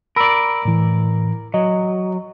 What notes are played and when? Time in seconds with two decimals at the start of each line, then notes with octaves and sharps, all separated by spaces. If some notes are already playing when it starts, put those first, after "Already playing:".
0.16 A#4 D5 B5 E6
0.65 A2 E3
1.54 F#3 D#5